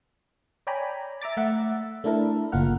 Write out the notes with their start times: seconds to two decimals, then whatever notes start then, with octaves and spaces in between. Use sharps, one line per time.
0.67 C#5 D5 G5 G#5 A#5 B5
1.22 E5 A#5 D6 A6
1.37 A3 E5 F#5
2.04 A3 D4 E4 A4 A#4
2.52 G1 C#3 A#3 F4 F#5 F6